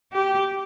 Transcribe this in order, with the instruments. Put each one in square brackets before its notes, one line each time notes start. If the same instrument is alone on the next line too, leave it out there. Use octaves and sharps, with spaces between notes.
[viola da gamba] G4